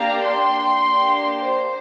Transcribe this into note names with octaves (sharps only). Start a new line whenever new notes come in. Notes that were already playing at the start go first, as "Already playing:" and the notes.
Already playing: A#3 D4 G4 F5 A#5
G5 C6
A#3 D4 G4
C5